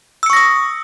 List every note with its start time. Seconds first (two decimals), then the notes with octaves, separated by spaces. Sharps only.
0.23 E6
0.26 C#7
0.30 C#6
0.33 A#6
0.37 D#6